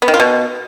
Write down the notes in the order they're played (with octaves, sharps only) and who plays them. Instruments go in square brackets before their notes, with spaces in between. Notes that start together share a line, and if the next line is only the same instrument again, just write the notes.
[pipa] B3
D#3
F4
B2